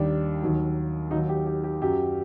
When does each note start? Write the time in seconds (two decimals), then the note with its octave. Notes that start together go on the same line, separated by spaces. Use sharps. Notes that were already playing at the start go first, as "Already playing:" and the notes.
Already playing: D#2 D#3 G3 D4
0.42 D#2 D#3 F#3
1.11 D#2 D#3 F#3 D#4
1.29 G4
1.46 G4
1.64 G4
1.81 F#2 F#3 G4